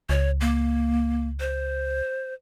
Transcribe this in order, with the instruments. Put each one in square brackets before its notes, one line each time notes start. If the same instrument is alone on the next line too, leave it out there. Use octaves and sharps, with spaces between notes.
[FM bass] C#2 [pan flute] C#5
[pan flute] A#3
C5